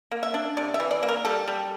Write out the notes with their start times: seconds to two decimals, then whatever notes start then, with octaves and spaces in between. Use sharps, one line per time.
0.11 A#3
0.23 E5
0.34 D4
0.57 C3 D5
0.74 E5
0.80 E3
0.91 D5
1.03 A#3
1.09 A#4
1.25 G3 A4
1.48 G3